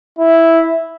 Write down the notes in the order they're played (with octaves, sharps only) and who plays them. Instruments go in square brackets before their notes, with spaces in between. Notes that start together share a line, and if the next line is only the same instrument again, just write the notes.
[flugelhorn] E4